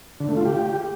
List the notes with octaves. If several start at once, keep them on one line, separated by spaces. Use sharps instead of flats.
D3
A3
F4
G4